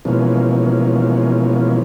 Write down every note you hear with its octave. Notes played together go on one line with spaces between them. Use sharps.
B2 E3 F3 G#3 A#3 C#4